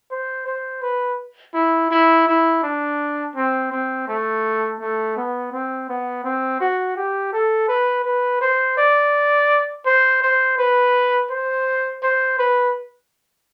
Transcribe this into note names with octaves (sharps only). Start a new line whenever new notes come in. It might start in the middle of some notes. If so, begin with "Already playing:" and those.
C5
C5
B4
E4
E4
E4
D4
C4
C4
A3
A3
B3
C4
B3
C4
F#4
G4
A4
B4
B4
C5
D5
C5
C5
B4
C5
C5
B4